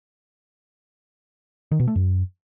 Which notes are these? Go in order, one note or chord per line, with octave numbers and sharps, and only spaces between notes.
D#3
B2
A3
F#2